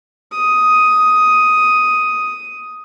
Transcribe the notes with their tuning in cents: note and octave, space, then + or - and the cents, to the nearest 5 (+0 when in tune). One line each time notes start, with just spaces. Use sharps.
D#6 +5